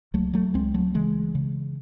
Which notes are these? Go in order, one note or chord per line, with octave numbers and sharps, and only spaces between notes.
C#2 F#3 A3
F#3 A3
C#2 G#3 C4
F#3 A3
C#3 E3 G#3
C#3